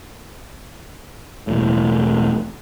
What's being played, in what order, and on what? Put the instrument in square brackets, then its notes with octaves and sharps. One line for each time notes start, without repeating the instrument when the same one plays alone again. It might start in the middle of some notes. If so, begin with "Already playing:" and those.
[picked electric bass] E1 A2